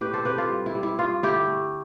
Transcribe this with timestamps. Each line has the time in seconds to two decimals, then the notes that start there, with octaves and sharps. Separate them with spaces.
0.01 A2 G4 B4
0.13 A4 C5
0.25 C4 G4 B4
0.38 F4 A4
0.50 G3
0.66 E4
0.75 G3
0.83 E4
0.98 G2 F4
1.23 D3 E4 G4
1.47 A3